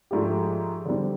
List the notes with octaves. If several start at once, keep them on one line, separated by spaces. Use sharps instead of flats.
G#2 F3 A3 D4 G4
D3 G3 C4